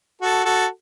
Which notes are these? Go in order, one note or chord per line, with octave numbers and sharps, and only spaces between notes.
F#4 A4
F#4 A4